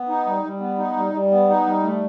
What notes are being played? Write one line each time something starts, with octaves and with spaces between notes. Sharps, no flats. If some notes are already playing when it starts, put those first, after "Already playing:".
Already playing: B3
D#4
G3
G3
B3
D#4
G3
G3
B3
D#4
G3
A3